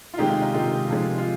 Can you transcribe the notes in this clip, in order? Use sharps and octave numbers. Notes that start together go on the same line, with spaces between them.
F4
C3 D#3 G#3 D#4 G4
F4
D#4
C3 D#3 G#3 F4
C3 F3 G#3
F4